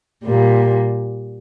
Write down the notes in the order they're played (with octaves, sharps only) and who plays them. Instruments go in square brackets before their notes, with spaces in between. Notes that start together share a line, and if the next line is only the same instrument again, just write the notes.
[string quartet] A#2 G3 A#3